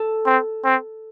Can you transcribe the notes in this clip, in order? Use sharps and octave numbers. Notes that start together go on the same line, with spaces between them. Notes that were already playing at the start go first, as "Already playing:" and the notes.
Already playing: A4
C4
C4